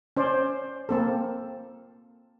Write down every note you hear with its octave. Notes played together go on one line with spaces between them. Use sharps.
C#4 C5 D5
A#3 C4 A4